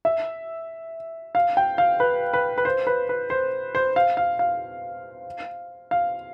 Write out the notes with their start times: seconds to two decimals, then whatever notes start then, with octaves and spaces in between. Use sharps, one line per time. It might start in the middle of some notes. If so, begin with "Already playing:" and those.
0.05 E5
1.35 F5
1.57 G5
1.78 F5
2.00 B4
2.33 B4
2.58 B4
2.65 C5
2.87 B4
3.09 B4
3.30 C5
3.75 C5
3.96 F5
4.17 F5
4.39 F5
5.91 F5